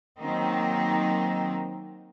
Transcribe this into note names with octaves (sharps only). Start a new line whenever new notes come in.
D#3 F#3 A#3 C4 D#4